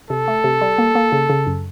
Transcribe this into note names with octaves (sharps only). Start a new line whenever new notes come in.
C3 A4
A3
C3
G3
A#3
A#3
C#3
C#3
F#2